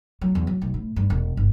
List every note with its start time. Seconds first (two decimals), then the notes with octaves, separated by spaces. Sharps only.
0.22 F#3
0.35 E2
0.47 F#3
0.62 B1
0.74 A2
0.96 G2
1.10 E1
1.37 G1